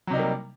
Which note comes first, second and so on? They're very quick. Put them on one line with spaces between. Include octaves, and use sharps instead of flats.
F#3 C3 D#4 G3 A#3